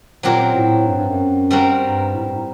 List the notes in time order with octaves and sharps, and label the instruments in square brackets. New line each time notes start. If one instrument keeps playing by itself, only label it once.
[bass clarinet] A#2 [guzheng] F#3 C4 G4 A#4
[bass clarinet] A2
G2
G2
F#2
[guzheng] G3 C4 F#4 A#4
[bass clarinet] G2
A2
G2
A2